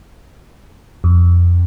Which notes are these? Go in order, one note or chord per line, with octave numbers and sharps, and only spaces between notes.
F2